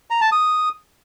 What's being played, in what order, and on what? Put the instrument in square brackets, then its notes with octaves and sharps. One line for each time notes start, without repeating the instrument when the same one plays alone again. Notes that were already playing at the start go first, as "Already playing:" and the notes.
[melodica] A#5
A5
D#6